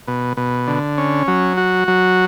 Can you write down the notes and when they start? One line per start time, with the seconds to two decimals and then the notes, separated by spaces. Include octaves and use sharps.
0.08 B2
0.37 B2
0.67 D3
0.98 C#4
1.28 F#3
1.57 F#4
1.88 F#3